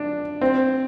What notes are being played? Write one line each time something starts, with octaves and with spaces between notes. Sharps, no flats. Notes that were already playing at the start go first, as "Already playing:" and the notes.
Already playing: D4
C4